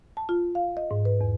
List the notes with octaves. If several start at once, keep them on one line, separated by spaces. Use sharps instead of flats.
A5
F4
F5
D#5
G#2
B4
E2